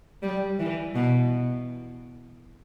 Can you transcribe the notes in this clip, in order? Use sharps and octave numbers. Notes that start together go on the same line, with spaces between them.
G3
E3
B2